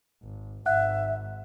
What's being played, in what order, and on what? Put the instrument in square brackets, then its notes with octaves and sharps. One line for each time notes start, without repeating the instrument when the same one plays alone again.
[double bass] G#1
[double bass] G#1 G#2 [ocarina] E5 [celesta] F#5 F#6